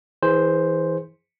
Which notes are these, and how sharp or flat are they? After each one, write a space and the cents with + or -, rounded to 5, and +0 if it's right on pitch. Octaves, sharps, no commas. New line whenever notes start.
E3 -20 G#4 +0 C5 +0